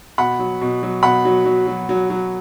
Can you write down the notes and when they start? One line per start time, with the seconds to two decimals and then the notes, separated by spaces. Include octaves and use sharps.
0.18 B2 F#5 B5
0.39 F#3
0.61 B2
0.83 F#3
1.03 B2 F#5 B5
1.25 F#3
1.45 F#3
1.67 F#3
1.89 F#3
2.10 F#3